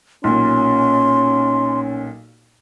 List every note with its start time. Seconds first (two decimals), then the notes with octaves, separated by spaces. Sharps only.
0.24 B1 A#2 C#4 C6